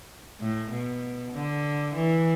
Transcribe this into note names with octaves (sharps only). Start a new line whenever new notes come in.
A2
B2
D3
E3